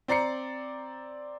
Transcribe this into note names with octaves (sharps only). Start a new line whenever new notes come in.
C4 D5 A#5 C7 C#7